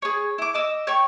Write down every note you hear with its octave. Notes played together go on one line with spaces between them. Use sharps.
G#4 C#5
E4 D6
D#5 D6 E6
C#5 G5 C#6